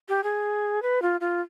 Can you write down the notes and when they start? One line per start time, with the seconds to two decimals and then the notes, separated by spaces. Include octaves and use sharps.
0.09 G4
0.24 G#4
0.82 B4
1.02 F4
1.21 F4